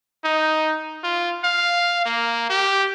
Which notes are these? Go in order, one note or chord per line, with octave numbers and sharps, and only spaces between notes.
D#4
F4
F5
A#3
G4